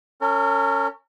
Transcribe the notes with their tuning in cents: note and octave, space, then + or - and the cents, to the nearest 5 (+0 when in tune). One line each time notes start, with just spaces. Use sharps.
C#4 +0 A#4 -45